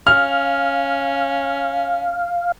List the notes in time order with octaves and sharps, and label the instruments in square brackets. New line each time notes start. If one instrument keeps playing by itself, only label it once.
[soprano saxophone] C#4 [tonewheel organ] F5 [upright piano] F6